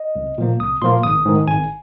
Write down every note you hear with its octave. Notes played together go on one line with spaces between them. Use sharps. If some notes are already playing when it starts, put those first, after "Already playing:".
Already playing: D#5
C2
A#2 F3 A#3
C2 D#6
A#2 F3 A#3 C6
G#1 D#6
G#2 D#3
G#1 G#5